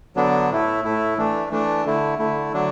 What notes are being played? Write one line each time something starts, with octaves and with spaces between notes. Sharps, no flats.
D3 F#3 B3 D4
A2 A3 E4
A2 A3 E4
E3 A3 D4
E3 A3 D4
D3 A3 E4
D3 A3 E4
D3 F#3 D4